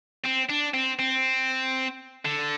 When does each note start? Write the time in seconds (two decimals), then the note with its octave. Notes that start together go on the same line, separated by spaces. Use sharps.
0.24 C4
0.49 D4
0.74 C4
0.99 C4
2.25 D3